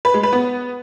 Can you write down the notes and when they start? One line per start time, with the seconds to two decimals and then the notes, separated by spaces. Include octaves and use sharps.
0.05 B4
0.14 G#3
0.23 B4
0.33 B3